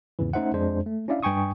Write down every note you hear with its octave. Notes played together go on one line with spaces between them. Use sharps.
E2 G#2 C#3 E3
A3 C#4 D#4 C5 E5 F#5
F2 G#3 D4 C5
A3
C#4 D4 E4 D5 E5 F5
G2 G5 G#5 C#6 D#6